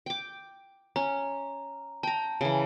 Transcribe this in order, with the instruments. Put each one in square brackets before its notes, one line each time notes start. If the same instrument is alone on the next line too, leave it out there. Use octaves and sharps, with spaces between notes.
[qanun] G5 D6
[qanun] C#4 [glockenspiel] A#5
[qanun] G5 A#5 [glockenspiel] A5
[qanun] C#3 E3